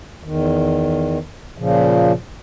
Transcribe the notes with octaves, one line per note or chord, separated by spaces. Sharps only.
E2 D#3
A#2 C#3 F3